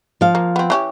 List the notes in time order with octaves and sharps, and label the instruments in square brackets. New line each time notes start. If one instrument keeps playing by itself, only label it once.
[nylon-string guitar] F3 F5
[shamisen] A#3
B3 C4
E3 C#4 G4